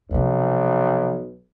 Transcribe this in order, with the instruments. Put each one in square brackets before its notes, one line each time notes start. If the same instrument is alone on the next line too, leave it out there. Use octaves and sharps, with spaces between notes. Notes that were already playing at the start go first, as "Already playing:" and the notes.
[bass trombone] B1 [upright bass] C3 F3